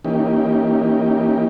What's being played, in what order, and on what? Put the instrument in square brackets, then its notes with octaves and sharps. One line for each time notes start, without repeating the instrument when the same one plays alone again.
[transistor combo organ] E3 A#3 C#4 D#4 G4